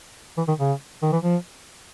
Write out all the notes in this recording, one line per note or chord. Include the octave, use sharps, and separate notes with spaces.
E3
D#3
C#3
D#3
E3
F3